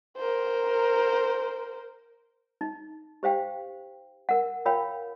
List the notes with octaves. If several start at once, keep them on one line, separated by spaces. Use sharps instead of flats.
A#4 C5
D#4
G4 C5 F5 G5
A#4 F#5
F4 A#4 C#5 F5 G5 B5